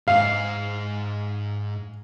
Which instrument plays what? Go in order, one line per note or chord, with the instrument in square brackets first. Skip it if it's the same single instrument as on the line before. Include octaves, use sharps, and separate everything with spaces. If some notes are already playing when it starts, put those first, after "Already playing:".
[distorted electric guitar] G#2 [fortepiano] F5